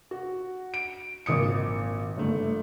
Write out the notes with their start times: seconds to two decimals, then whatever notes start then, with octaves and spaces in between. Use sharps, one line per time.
0.11 F#4
0.74 D7
1.26 G#1 A#2 D#6 C#7
2.17 G1 A3